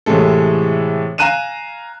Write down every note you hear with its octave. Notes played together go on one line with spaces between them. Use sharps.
A2 C3 E3 G#3 A4
F5 G#5 A#5 F#6 D#7 E7